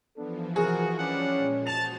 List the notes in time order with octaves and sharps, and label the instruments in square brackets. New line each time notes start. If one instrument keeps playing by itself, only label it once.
[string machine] E3 F3 [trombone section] B3 D4 A4
[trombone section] C3 A#4 C5 [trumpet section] F#4 [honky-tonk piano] G#4
[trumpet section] G3 D4 F#5 [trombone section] C#4
[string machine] A#2 G#3
[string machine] F#4 G#4 C5 [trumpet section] A5 [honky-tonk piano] F7